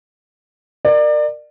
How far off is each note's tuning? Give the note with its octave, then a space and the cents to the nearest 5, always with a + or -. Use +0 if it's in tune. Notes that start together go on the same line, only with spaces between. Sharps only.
A#4 +0 D5 +30